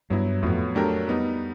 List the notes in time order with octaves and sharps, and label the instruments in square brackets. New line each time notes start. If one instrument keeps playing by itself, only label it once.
[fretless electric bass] G2 [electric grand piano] F#3 B3 E4
[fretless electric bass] F2 [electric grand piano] A2 F#3 B3
[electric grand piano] F#3 A3 D4 G4 A#4
G3 B3 D#4